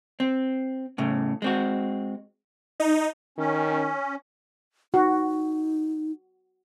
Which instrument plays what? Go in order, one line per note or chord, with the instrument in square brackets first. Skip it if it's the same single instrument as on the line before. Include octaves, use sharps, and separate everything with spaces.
[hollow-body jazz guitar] C4
A2 C#3
G#3 C4 F#4
[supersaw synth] D#4
[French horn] D#3 [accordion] C#4
[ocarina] D#4 [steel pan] F#4